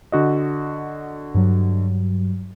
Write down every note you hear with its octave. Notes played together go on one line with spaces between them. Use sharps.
D3 F#4 D#5
G2 F#3